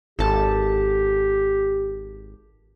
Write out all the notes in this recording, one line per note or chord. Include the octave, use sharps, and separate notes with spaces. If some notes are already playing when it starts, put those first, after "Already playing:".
G#1 G4 A4 A5